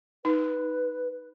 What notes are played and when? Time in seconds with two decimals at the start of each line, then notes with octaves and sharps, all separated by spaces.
0.25 D#4 B4